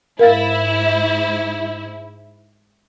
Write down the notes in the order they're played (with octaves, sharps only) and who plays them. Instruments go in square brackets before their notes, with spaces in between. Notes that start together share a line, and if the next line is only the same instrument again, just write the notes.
[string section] G#2 E4 [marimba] A#4 F5 A6